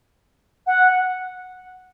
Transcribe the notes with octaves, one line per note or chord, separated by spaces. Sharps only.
F#5